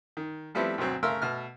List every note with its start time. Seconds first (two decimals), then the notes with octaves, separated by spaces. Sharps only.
0.17 D#3
0.55 F3 G3 A3 B3 C4 E4
0.78 D2 B2 F#3 C4
1.03 C#3 A3 A#4 F5 C6 E6
1.22 B2 A3 F6